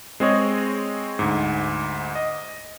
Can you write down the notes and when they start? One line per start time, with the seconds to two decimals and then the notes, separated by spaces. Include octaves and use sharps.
0.20 G#3 C4 G#4 C#5 D#5
1.19 D2 G#2
2.15 D#5